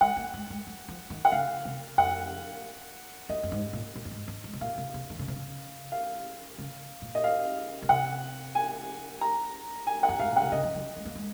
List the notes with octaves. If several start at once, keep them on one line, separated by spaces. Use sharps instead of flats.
G#3 F#5
A#3
G#3
G#3
F#3
F3
D#3
F#5
C#3 F5
C3
F2 F#5
F#2 D#5
F#2
G#2
A#2
A#2
F#2
G#2
F#2
G#2
C3
A#2 F5
C3
C3
D#3
C#3
C3
C#3
F5
C#3
A#2
D#5
F5
A#2
C3 F#5
G#5
A#5
G#5
F#5
F#2
G#2 F5
A#2
F#5
C3
C#3 D#5
F3
F#3
G#3
A#3
G#3